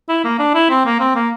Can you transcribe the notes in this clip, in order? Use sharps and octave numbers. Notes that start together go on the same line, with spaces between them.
E4
A#3
D4
E4
C4
A#3
C4
A#3